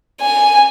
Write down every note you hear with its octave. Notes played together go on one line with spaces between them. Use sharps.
G#5